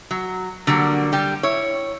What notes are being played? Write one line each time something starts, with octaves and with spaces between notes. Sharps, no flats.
F#3
D3 F#3 G3 A#3
D3 G3 G4
E4 C#5